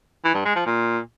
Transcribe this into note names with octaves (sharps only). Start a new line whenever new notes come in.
E3
G2
G#3
F3
A#2